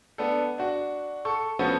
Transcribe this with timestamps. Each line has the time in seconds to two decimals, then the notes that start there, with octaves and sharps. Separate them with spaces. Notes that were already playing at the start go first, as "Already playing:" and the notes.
0.18 B3 D4 A4
0.58 D4 F#4
1.25 A4 C#6
1.59 F3 B3 C#4 F#4 A4